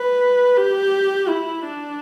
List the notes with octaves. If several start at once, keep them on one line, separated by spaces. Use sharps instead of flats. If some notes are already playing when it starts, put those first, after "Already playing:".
Already playing: B4
G4
E4
D4